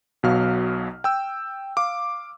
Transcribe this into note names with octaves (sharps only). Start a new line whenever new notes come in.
B1 B2 F#3 F5 F6
G5 E6
F5 D6